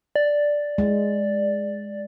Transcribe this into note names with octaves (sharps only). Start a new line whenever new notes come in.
D5
G#3